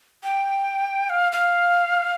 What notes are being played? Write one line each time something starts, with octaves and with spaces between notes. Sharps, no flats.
G5
F5
F5